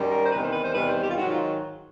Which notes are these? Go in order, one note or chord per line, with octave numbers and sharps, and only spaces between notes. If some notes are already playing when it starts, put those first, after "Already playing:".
Already playing: F#2 D#3 G3
A#4
C5
E2 C3 D#3 G3 B4
C5
B4
C5
E2 C3 D#3 G3 B4
C5
G4
F4
G#2 D#3 F#3 F#4
F4